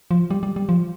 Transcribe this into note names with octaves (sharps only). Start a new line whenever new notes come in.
F3
G3
G3
G3
F3